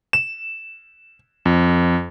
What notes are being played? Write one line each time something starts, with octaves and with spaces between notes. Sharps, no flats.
E7
F2